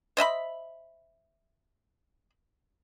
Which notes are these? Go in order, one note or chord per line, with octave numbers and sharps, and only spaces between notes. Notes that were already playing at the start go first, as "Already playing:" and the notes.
C5 D#5 E5 B5